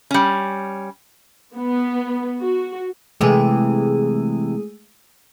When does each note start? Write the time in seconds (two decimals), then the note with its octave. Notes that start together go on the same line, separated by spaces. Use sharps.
0.11 G3 C#4
1.54 B3
2.39 F#4
3.21 C3 E3 G#3 A3 G4 G#4